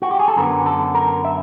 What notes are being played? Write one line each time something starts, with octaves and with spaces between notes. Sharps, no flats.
F#4
G4
G#4
A4
F#2 D3 F#3 B3 A#4
A4
A#4
E5